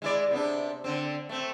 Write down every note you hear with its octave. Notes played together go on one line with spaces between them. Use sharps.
G#3 E4 D5
C3 B3 D4
D3 C4
A3 C4